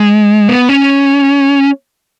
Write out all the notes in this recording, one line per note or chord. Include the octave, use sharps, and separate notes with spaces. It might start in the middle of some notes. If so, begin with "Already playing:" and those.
Already playing: G#3
B3
C#4